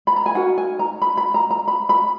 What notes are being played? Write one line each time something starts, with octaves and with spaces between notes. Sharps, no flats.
B5
A#5
G#5
D#4 F#4 A#4 F#5
G#5
A#5
B5
B5
A#5
A#5
B5
B5